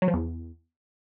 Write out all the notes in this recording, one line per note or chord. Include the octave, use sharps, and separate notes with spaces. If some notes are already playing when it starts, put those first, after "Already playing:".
F#3
F3
E2